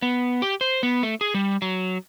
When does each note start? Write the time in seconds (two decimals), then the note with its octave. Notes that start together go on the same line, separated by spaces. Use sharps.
0.02 B3
0.42 G4
0.61 C5
0.83 B3
1.03 A3
1.21 G#4
1.34 G3
1.62 F#3